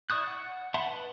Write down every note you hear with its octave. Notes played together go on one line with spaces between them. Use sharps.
E4 D5 C#6 D#6 F#6
F#5
E5 F#5 A5 B5 C6
B4